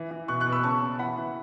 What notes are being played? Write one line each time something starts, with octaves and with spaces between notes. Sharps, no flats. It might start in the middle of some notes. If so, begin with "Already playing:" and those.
Already playing: E3
E3
B2 C#6 F#6
C#6 F#6
B2
B5 E6
C#3 A5 C#6
C#3
E3 F#5 B5
E3